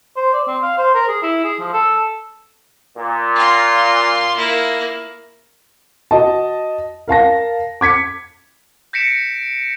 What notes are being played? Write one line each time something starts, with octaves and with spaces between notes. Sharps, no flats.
C5
D5
C4
F5
C5
A#4
G#4
E4
G#4
F3
A4
A#2
F4 C6
A#3 E4
F#4 D#5 A5
A#4 F5 A5 A#6
D6 G#6 B6 C#7
G6 A#6 B6 C#7 D7 E7